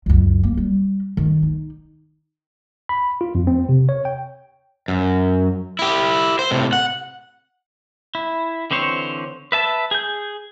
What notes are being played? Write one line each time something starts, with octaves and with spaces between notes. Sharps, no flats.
C#2 F#2
A#3
G3
D#3
D#4
B5
F4
F2
C4
C3
C#5
G5
F#2
E4 G4
C5
A2 C3
F#5
E4
D3 E3 C4 C5 C#5
B4 E5 A5
G#4 G6